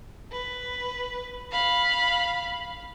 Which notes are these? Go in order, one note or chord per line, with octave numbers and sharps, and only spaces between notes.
B4
F5 B5